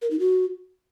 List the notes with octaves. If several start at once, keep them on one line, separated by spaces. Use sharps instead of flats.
A#4
D#4
F#4